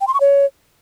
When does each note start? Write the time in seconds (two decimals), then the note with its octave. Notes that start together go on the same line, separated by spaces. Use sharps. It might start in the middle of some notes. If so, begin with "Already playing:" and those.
0.01 G5
0.07 C6
0.14 C#6
0.20 C#5